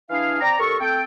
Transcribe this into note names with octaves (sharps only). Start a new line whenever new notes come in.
E3 D4 E4 G#4 F5
C4 D5 G5 A#5
C2 A4 A#4 C#6
A3 C4 A4 G5